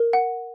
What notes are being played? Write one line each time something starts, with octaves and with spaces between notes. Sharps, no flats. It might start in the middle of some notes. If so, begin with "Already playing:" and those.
Already playing: A#4
F#5